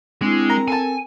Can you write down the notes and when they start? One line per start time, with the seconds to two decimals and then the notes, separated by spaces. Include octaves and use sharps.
0.21 G#3 C4 D4 E4
0.50 A#4 A#5
0.68 A4 G#5 A5